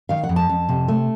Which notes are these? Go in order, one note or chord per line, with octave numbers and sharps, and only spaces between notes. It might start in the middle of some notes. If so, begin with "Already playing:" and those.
D#3 F5
F#5
F2
A5
F2
C3
A3